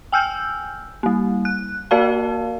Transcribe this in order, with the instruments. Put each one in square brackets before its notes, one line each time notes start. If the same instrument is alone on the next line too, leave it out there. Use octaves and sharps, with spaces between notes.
[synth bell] G5 G#5 E6 F6 G6
G3 A#3
F#6
A#3 F#4 A#4 D5 F5 A5